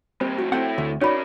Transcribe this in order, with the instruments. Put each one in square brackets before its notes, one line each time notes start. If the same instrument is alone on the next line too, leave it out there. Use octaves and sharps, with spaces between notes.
[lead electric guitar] G3 A#3 [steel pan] C4 [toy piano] C5
[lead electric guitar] A2 F3 [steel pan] F#4
[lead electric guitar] A3 E4 [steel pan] C4 G5 [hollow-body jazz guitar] F#5
[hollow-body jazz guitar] D2
[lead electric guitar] C#4 A#4 [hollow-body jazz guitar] D#4 [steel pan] F#4 D5 [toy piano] C#5 B5